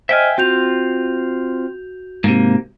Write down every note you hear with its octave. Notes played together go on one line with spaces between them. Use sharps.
C5 D#5 E5 G5 G#5 F6
C4 F4 F#4 G6 F7
G#2 C3 A#3